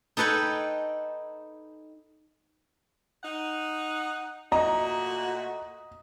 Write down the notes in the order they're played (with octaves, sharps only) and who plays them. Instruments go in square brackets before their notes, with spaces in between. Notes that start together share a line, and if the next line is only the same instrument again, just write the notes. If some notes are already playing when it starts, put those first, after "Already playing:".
[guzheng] D#4 A4 B4 C#5 G5
[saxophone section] D#4 F#5
[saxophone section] A#2 A3 F#4 [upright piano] D#5 [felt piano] A#5